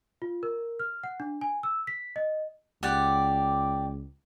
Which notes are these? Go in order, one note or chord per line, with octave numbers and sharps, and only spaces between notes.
F4
A#4
F6
F#5
D4
G#5
E6
B6
D#5
C#2 G4 D5 F#5